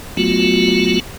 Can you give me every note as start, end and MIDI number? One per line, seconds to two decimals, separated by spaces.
0.17 1.00 54
0.17 1.00 57
0.17 1.00 59
0.17 1.00 65
0.17 1.00 66